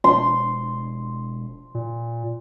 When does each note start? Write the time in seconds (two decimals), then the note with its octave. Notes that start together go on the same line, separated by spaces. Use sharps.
0.04 E1 C6
1.75 A#2